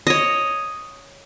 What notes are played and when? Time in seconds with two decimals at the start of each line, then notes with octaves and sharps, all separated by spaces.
0.07 C#5 D#5